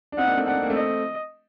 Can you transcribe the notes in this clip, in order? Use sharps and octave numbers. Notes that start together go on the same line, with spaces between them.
D4
C4 D#4 F#5
A#3 D4
A3 C4
D4 F#5
C4
A#3
A3 C4
D#5